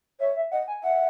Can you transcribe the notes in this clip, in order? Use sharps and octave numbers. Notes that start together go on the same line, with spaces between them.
C#5 E5
E5
D#5 F#5
G#5
E5 F#5